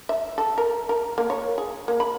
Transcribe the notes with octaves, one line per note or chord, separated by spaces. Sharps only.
E5
A4
A#4
A#4
A#3
C#5
G#4
A#3
B5